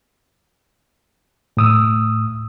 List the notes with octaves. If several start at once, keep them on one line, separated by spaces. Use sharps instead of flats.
A2 D#6 E6